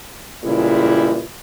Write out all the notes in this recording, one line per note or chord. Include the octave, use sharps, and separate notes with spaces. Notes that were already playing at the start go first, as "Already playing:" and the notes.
A#2 C#3 E3 G3 G#3 E4